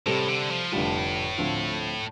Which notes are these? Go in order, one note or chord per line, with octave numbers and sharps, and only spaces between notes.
A2 C3 G3 C4 A4
D3
F3
F1 F2 A2 D3 G3 F4
D2 D3 F3 C4 F4